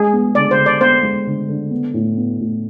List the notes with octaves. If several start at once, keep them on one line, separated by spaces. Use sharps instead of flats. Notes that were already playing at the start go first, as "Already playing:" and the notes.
Already playing: G#3 G#4
B3
D3 D5
C5
D3
D5
B3 C5
G#3
D3
D3
B3
A2
B3
A2